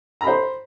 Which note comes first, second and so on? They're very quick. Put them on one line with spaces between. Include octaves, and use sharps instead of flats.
A#5 B5 C5